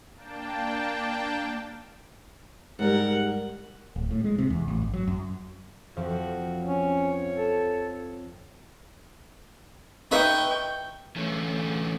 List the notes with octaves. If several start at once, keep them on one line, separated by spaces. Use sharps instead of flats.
A#3 D4 G5 A5
G#2 G3 A#4 F#5
D1
A2
G#3
C3
E2
A1
G1
F#3
F#2
F2 F3 F#4
C#4 C#5
A4
D#4 B4 E5 G5 C#6
D3 E3 A3 C#4